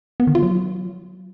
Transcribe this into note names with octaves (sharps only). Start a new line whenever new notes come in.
B3
D#3
F4
F#3